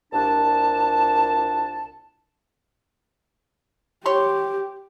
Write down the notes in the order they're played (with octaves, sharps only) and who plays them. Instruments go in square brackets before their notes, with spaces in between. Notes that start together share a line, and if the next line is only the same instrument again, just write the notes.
[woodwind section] C2 A#2 D4 A5
[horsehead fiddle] G4 [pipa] C#5 C6